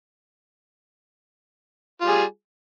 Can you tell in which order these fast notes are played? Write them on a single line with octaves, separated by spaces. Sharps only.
F4 G3 G#4